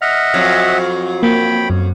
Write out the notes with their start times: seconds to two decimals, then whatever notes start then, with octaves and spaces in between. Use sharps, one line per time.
0.02 D#5 E5 F#5 F6
0.34 F2 F#3
1.23 A#3 G5 B5
1.70 F#2